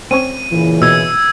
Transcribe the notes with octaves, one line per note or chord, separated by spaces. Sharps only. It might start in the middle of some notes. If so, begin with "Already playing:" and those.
C4 C#4 C#5 D#7
A#2 C#3 E3
B2 E6 G#6